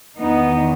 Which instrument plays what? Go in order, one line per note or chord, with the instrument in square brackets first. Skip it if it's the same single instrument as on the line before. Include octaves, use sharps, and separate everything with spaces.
[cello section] E2 D#3 B3 D#4